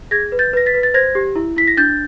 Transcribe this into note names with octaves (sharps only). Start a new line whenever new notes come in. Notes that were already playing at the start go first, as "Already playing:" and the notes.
G#4 G#6 A#6
B4
G6 A6
B4 A#6
A6 B6
B4
A6
C5 G#6 A#6
G4
E4
E4 B6
A#6
D4 G6 A6